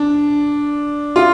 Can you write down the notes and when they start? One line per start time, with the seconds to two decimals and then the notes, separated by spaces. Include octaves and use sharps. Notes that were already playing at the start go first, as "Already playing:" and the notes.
Already playing: D4
1.16 F4